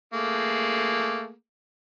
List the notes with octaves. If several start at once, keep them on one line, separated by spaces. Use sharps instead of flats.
A3 A#3 G#4